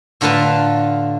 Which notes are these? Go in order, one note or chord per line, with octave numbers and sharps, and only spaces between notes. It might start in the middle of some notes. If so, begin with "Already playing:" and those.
A2 D3 F4 B4 A5 A#5